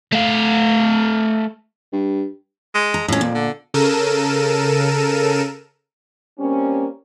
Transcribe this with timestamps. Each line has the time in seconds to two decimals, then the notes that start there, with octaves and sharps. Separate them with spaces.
0.13 A3 F5
1.92 G2
2.75 G#3
2.94 A#5
3.08 F2 A2 C#4
3.21 A#2
3.34 D3
3.74 C#3 A4 A#4 D#7 E7
6.39 G3 A#3 C4 C#4